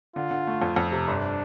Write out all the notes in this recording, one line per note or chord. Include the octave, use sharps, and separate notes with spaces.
D3 F4
D3
A3
F2
F2
C3
G1 D4